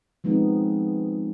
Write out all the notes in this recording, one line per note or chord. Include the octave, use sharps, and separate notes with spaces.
F3 G#3 B3 C4 D#4